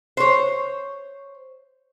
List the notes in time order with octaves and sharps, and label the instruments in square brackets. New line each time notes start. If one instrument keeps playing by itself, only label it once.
[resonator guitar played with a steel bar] C5 C#5